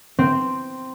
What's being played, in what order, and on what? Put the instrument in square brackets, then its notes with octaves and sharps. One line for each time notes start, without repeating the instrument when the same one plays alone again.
[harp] C4